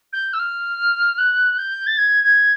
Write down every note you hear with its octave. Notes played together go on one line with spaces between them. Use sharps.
G6
E6
F6
F#6
G6
A6
G#6
G#6